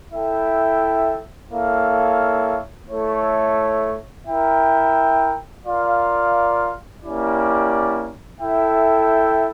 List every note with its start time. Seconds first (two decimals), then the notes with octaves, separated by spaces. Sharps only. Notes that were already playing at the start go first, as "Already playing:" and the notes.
0.12 E4 A4 E5 G5
1.50 A#3 E4 A4 C#5 F5
2.88 A3 E4 A4 C#5
4.26 E4 A#4 E5 G5
5.64 F4 A#4 D5 F5
7.02 A#3 C#4 E4 G4 D5
8.41 E4 A4 E5 G5